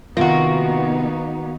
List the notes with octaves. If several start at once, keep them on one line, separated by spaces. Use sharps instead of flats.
C3 D#3 A#3 B3 D#4 F4 F#4